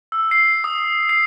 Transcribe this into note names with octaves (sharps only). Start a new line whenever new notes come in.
E6
C7
D#6
C7